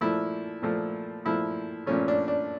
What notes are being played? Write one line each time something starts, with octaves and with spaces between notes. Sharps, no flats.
A#2 F3 A3 E4
A#2 F3 A3
A#2 F3 A3 E4
A#2 F3 A3 C#4
D4
D4